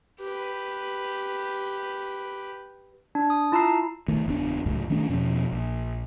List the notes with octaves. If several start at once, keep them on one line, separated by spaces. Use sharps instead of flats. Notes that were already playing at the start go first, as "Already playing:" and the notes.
G4 B4
D4
D#6
E4 F4 A5 A#5 E6 C7
D#3 A3
F#1 E2 D4
C#2 F#2 A2
D#3 A3 C#4 D4
E2 B2 F3 C#4
A#1